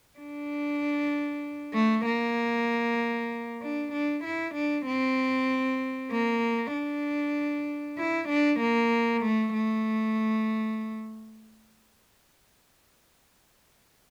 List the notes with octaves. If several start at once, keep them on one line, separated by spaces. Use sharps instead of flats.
D4
A3
A#3
D4
D4
E4
D4
C4
A#3
D4
E4
D4
A#3
A3
A3